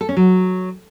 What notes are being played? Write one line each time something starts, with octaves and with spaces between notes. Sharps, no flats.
A4
C#4
F#3